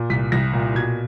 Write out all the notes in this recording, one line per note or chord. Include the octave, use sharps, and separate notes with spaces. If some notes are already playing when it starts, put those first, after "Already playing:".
Already playing: A#2
C2 B6
C2 A#6
A#2
B2 G#6